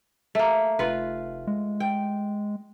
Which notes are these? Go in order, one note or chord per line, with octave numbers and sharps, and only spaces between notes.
A3 A#3
F1 F4 B4
G#3
G5